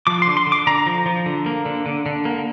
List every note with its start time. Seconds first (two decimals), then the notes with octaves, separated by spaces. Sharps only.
0.07 F3 D6
0.22 C6
0.27 D3
0.37 C6
0.47 D3
0.52 D6
0.67 D3 A#5
0.86 F3
1.06 F3
1.26 D3
1.46 A#3
1.66 D3
1.86 D3
2.06 D3
2.25 A#3